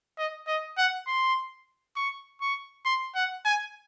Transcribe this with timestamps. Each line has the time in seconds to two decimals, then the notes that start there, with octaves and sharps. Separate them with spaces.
0.18 D#5
0.47 D#5
0.77 F#5
1.07 C6
1.96 C#6
2.41 C#6
2.85 C6
3.15 F#5
3.45 G#5